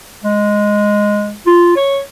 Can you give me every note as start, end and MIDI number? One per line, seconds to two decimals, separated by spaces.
0.24 1.35 56
1.47 1.73 65
1.76 2.01 73